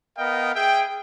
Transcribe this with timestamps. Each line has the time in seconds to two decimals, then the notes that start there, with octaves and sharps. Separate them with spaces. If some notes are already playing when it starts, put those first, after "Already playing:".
0.18 B3 A#4 D#5 F5 G5
0.54 G#4 E5 G5